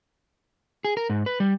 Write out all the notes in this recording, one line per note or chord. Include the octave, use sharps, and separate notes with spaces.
G#4
A#4
G#2
B4
G3